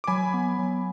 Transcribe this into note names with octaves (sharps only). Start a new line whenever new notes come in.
D6
F#3 G#5 B5
B3
F#3